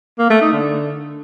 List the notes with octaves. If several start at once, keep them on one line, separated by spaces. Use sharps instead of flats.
A#3
A3
D#4
D3